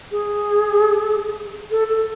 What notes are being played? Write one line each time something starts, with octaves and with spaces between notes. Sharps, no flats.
G#4
A4
A4